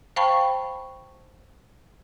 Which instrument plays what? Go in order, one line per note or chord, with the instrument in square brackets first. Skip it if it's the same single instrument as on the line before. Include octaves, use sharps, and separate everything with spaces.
[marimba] C5 F5 G5 A5 B5 C#6